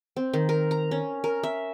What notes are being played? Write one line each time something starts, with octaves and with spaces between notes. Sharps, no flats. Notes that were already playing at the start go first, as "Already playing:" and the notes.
C4
D#3
A#4
A#5
C#4
A#4
E5